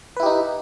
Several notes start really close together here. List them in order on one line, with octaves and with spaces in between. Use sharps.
B4 E4 G4 D#4